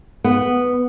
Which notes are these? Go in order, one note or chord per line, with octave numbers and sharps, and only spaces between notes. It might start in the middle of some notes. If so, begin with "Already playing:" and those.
B3